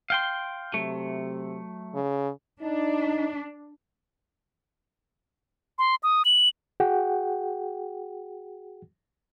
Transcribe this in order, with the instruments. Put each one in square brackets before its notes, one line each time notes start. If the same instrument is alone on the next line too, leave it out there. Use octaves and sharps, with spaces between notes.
[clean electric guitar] F5 G5 C6
[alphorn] C3 [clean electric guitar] F#3 A3
[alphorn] C#3
[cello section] D4 [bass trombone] D#4
[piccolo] C6
D#6
F#7
[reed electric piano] F#4 G#4 F#5 G5